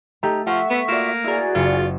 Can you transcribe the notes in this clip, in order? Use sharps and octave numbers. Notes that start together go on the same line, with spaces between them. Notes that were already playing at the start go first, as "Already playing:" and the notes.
A3 D#4 G4 A#5
F3 E5 F#5 C#6
B3
A#3 F4 F#4 D5 E7
E4 F#4 G#4 A#4 D5
F#1 F4 C#7